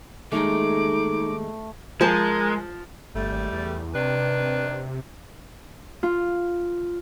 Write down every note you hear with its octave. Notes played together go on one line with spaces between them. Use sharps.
D#2 G#3 A3 D#4 D6
F3 G#3 A#4 C5 A5
G1 G3 A3
G#1
E2
C3 D#3 D4 B4
F4